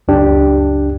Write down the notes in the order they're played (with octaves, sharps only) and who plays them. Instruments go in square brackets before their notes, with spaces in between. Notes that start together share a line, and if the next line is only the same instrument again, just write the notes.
[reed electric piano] C#2 F#2 D4 G4